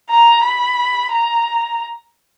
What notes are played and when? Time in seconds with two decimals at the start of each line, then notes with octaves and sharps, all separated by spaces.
0.11 A#5
0.44 B5
1.13 A#5